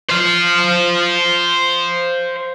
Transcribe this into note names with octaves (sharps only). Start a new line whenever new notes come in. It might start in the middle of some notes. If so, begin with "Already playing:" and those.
C5 F5